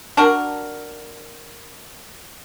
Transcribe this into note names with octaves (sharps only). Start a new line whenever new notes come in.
D4 F#4 A#4